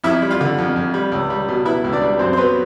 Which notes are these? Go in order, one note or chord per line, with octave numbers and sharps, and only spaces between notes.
F2 E4 E5
G3
F4 F5
D3
F2
F2
G3
C#2
G3
B2
B3 E4 E5
C#2
D4 D5
G3
F#2 C4 C5
C5
F#3 B3 B4